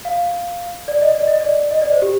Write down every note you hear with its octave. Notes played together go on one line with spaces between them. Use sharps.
F5
D5
D#5
D5
D#5
D5
D#5
D5
C5
G4